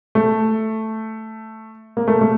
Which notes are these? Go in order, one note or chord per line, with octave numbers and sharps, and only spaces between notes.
A3
A#3
A3
A3